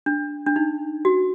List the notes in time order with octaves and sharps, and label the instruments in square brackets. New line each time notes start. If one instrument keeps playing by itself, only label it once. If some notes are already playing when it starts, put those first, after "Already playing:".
[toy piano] D4
D4
D#4
F#4